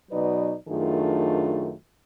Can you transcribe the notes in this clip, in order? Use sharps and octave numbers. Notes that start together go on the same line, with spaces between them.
B2 F#3 D#4 B4 D5
F#2 D#3 A3 D4 F4 G#4